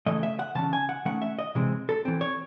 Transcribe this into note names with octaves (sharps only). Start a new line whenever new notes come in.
C#3 E3 A3 D#5
E5
F#5
C#3 E3 C#4 A5
G#5
F#5
D#3 A3 C#4 F#5
E5
D#5
C3 E3 G#3 C4
A4
E3 C4
C#5